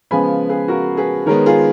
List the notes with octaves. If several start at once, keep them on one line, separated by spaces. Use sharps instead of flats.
C#3 F3 G#3 B3 G#5 B5
G#4 B4
F#4 A#4
G#4 B4
D#3 G#3 B3 A#4 C#5
F4 G#4